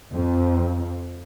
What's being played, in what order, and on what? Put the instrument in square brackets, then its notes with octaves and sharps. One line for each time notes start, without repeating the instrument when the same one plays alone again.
[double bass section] F2